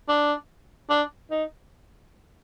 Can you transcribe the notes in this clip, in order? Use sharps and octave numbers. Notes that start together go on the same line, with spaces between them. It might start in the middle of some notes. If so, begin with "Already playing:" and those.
D4
D4
D#4